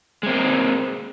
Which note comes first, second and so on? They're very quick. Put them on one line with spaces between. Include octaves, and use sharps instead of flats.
G#3 C4 A#3